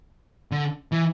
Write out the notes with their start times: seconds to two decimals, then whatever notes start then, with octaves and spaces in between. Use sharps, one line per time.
0.52 D3
0.92 E3